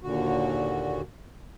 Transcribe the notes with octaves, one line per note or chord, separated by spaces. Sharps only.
D#2 A#2 D3 F#4